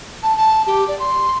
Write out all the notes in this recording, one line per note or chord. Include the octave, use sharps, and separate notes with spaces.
A5
A5
G4
D5
C6